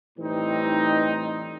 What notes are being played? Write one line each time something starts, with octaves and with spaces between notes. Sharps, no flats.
A2 E3 G3 C4 D#4